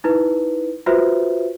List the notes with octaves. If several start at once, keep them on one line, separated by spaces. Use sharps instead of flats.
D#4 E4 B4
F4 F#4 B4 C5 E5